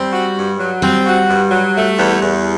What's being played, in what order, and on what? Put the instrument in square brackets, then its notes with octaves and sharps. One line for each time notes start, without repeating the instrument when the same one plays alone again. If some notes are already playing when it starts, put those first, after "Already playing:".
Already playing: [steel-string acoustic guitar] G3 [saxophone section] C4
[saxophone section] F#4
G2
F#3
[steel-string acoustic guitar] G3 [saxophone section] C4
[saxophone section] F#4
G2
F#3
A3
E2
E2